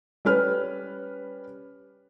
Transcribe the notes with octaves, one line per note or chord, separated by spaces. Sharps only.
G3 C#4 B4 F6